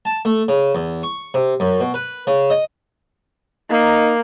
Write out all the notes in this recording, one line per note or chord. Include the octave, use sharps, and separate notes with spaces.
A5
A3
C#3
E2
C#6
C3
F#2
B2
B4
C#3
D#5
A#3 D#4